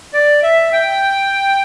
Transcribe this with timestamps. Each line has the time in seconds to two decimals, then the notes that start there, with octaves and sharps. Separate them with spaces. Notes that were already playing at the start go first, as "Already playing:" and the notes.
0.14 D5
0.43 E5
0.73 G5